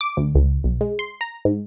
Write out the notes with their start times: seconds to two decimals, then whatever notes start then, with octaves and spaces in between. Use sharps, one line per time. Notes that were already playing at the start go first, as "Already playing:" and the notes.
0.01 D6
0.17 D2
0.35 C#2
0.64 B1
0.81 G#3
0.99 C6
1.21 A#5
1.45 G#2